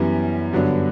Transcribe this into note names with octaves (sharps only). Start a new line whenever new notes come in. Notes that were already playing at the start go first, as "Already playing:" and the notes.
Already playing: F#2 E3 G3 B3
G2 D3 F#3 B3 D4